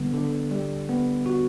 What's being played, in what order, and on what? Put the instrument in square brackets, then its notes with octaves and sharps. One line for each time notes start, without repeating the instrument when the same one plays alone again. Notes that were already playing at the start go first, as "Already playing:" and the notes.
Already playing: [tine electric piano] D3 G3 B3
D3
G3
B3
F#4